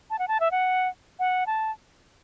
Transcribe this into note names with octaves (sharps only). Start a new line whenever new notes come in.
A5
F#5
A5
E5
F#5
F#5
A5